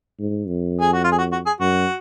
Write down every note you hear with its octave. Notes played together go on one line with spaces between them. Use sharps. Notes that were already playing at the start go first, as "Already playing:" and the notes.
G#2
F2
G#4
F#4
F4
G#4
F#4
F#4
G#4
F#2 F#4